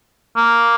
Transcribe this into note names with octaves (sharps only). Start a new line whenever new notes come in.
A#3